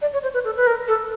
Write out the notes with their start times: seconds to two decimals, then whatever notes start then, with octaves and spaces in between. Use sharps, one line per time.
0.02 D5
0.13 C#5
0.23 C5
0.34 B4
0.44 A4
0.56 B4
0.67 A#4
0.88 A4